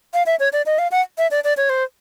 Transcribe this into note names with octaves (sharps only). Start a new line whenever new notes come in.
F5
E5
C#5
D5
D#5
F5
F#5
E5
D5
D5
C#5
C5